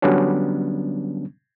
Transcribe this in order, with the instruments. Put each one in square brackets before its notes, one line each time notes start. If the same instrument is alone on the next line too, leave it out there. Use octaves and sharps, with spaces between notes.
[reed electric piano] D3 F#3 G3 B3 C#4 D4